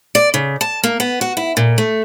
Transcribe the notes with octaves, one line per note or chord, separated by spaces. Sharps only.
D5
C#3
A5
A#3
B3
F#4
E4
A#2
A3